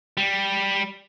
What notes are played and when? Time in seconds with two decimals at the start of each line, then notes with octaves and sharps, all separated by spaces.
0.17 G3